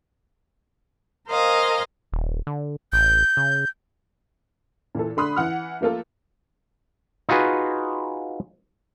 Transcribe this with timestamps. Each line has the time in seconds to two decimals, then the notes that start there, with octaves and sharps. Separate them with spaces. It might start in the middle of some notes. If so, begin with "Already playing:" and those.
1.28 A#4 C5 D#5 F5 G#5
2.12 D#1
2.47 D3
2.93 A1 G6
3.37 C#3
4.95 A#2 E3 A4
5.17 D3 A3 B5 C6 D#6 F#6
5.36 E3 F#5 F6
5.81 F3 A3 A#3 F4 A4
7.29 D#4 F4 F#4 G#4 B4